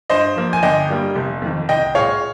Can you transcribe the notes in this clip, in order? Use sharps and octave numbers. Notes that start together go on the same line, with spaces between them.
G2 C5 D#5
F3 A#3
G#5
G1 D#5 G5
G2 G3 A#3
F1
F2 D#3
C2 D#5 G5
A#2 G#3 C#5 F5